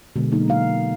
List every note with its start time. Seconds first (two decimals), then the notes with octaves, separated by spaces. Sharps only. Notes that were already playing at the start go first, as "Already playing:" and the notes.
0.16 B2 D3 G#3
0.32 F#3 A#3 D#4
0.48 A#3 F#4 F5